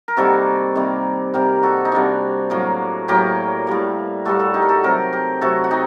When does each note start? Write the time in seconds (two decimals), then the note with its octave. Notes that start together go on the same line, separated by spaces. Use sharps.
0.08 A#4
0.17 C3 D#3 G3 A#3 F#4 A4
0.75 C3 D#3 G3 A#3
1.34 C3 G3 A#3 G4 A#4
1.63 F#4 A4
1.85 D#4
1.92 C3 G3 A#3 D4 F#4
2.50 A2 F#3 A#3
3.08 A2 F#3 A#3 G4 A#4
3.67 A2 G3 A#3
4.25 A2 G3 A#3 F#4 A4
4.39 F#4 A4
4.54 D#4 G4
4.62 A#4
4.69 F#4 A4
4.83 C3 F#3 A3 G4 A#4
5.13 G4 A#4
5.41 C3 F#3 A3 F#4 A4
5.64 F#4
5.71 D#4 G4